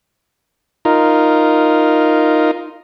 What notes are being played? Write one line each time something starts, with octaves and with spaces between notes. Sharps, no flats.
D#4 F4 A#4